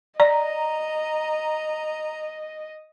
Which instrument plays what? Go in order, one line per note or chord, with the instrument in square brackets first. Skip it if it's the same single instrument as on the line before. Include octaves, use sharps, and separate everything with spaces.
[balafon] D5 [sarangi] D#5 [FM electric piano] A#5